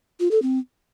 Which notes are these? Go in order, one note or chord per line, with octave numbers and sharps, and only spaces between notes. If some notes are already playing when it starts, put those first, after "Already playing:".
F4
A4
C4